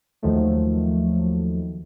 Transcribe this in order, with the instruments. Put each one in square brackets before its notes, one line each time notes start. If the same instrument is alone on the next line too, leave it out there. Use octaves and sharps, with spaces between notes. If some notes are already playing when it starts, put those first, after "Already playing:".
[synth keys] D#2 D#3 F3 F#3 A3